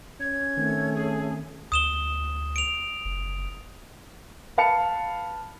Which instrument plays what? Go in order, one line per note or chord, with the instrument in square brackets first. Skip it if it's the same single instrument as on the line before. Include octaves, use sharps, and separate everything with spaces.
[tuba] C#4 [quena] G#6
[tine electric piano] D#3 C4 [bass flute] A3
[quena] G#4
[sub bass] D2 [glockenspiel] D#6 E7 G7
[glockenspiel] D7 F7
[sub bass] F#1
[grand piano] B4 F5 A5 C#7